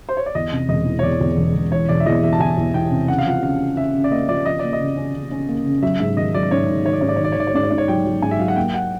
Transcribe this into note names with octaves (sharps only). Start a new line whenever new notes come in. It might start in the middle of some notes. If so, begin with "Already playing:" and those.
C5
C#5
D5
E2 D#5
C3
E1 D#5
E3
C#5
E2 D5
E2
E1
E1
E3 C#5
E1 D5
E5
E2 D#5
E2 E5
A5
E2 G#5
E2
E3 G5
C3
C#3 F#5
F5
F3 F#5
C#3 F5
C#4
C#4 E5
C#3
D5
A#3 D#5
F3 D5
F3 D#5
A#3 D5
D#5
C#3
C#4
C#3
C#4
A#3
C#3
F#3 E5
G#2 E5
D#3 D#5
F#3 D5
G#2 C#5
G#2
D#3 C#5
D5
G#2 C#5
D5
C#5
D#3 D5
C#5
D#3 D5
C#5
G#2 D5
C#5
G#2 D5
C#5
F#3 G5
F#3
G#2 G#5
E5
F#3 F5
F#5
A#3 G5
F#5